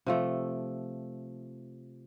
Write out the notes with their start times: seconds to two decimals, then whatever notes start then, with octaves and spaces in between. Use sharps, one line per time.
0.06 C3 F3 A3